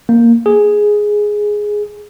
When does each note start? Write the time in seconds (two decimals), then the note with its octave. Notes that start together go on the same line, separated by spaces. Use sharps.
0.09 A#3
0.46 G#4